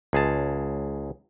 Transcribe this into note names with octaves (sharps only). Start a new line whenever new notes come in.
C#2 G#4 A5